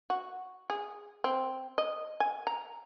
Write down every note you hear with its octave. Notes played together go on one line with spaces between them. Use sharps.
F#4
G#4
C4
D#5
G#5
A#5